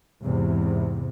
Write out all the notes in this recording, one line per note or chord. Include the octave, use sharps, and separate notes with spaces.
E2 G#2 C3